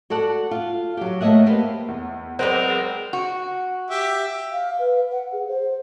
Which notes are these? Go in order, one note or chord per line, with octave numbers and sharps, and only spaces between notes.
F#4 A4 D5 F#5
F4
F#3 G4
A3 A#3 C#5 D#5 E5 F#5
A#3 G4 B4 C5
E2
F#3 G#3 B3 C4 A#4 C5 D5
F#4
G4 E5
F5
B4
F#5
G#4
C5